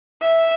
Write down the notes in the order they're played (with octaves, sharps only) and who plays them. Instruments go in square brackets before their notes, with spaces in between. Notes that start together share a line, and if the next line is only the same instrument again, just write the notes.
[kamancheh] E5